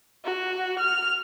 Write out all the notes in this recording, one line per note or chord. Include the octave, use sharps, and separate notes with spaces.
F#4
F6